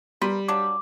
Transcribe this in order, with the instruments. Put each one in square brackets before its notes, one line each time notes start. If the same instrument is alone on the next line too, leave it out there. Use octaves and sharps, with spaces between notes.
[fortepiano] G3 [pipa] A#4 B4 C6
[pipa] F#3 A#3 D4 [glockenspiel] D6